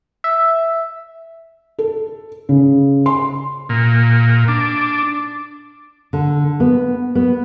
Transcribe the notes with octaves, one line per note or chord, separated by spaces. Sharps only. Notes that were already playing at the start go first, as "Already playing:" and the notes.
E5
A4
C#3
C6
A#2
D4
D3
B3
B3